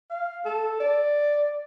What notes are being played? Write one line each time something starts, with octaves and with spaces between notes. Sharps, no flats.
F5
A4
D5